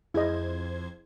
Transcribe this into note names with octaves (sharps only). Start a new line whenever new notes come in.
F2 E4 G#4 C5 D#5 G#6